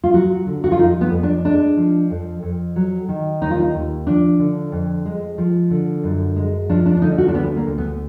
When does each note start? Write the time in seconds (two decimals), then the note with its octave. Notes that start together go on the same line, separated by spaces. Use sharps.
0.04 F4
0.14 F#3 F#4
0.47 D3
0.64 F#4
0.72 F4
0.79 F2 D#4
1.01 B3
1.12 F2
1.23 D4
1.45 G#3 D4
1.77 F3
2.10 F2
2.43 F2
2.76 F#3
3.09 D#3
3.42 D#2 D#4
3.51 F4
3.60 D#4
3.74 D#2
4.07 F3 D4
4.39 D3
4.72 F2
5.06 G#3
5.38 F3
5.71 D3
6.03 F#2
6.36 G#3
6.69 F3 D4
6.86 D4
6.97 D4
7.02 D3 D#4
7.18 F#4
7.28 D4
7.34 D2 B3
7.56 A#3
7.67 D2
7.78 B3